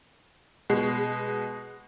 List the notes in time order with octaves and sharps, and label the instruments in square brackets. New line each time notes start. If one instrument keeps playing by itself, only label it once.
[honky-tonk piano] B2 G#3